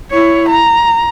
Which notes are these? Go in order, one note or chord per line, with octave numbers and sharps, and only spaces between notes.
E4 C#5
A#5